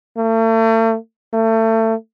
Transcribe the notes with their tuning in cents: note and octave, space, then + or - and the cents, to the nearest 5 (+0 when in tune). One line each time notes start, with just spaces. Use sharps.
A3 +40
A3 +30